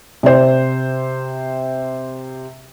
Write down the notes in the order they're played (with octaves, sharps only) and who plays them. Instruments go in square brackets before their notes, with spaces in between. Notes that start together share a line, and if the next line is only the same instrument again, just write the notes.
[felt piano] C3 C5